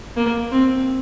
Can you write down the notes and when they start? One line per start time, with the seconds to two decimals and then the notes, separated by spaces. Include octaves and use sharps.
0.17 A#3
0.51 C4